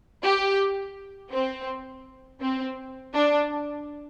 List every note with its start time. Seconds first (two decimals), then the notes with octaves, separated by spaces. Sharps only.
0.23 G4
1.31 C4
2.41 C4
3.13 D4